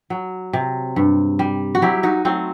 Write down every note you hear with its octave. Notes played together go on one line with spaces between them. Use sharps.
F#3
C3
G2
G3
F#4
F#3 E4 G4
D#4 F#4
F#3 A3 C4